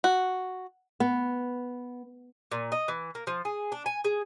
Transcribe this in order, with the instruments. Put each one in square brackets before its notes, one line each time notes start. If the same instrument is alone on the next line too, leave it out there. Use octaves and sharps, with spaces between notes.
[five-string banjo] F#4
[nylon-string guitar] B3
[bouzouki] A#2
D#5
E3
A#3
F3
G#4
D4
G#5
G#4